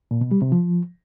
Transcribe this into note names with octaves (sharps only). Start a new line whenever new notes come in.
A#2
B2
G3
C3
F3